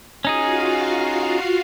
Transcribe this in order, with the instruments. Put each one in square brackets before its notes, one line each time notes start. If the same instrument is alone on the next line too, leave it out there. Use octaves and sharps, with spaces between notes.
[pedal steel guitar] C#4 D#4 G#4 [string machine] F4 F#4 F5